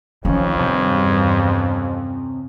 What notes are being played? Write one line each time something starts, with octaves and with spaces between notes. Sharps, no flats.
F2 D#3 F3 C#4
E2 G2 C3 C#4